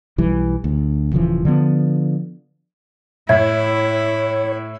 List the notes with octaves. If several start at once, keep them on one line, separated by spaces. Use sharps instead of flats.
B1 E3 G3
D2
D#1 C#3 E3 F3
D3 F3 B3
A2 E4 C#5 E5